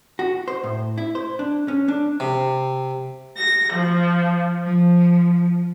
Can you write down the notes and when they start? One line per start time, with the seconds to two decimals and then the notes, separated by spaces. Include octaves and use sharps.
0.19 F#4
0.48 C5
0.64 A2
0.98 E4
1.15 C5
1.39 D4
1.68 C#4
1.88 D4
2.20 C3
3.36 A#6
3.73 F3
4.64 F3